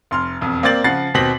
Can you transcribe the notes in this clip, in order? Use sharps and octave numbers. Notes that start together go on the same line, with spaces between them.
F1 C6 F6
E1 F2
A#3 C4 D5 A6 F#7
C#3 F3 F#5 A6 C7
D#2 B2 C4 A#6 B6 F#7